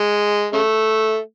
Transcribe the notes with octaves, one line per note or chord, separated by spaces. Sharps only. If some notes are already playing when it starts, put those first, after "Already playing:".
Already playing: G#3
C#3 A3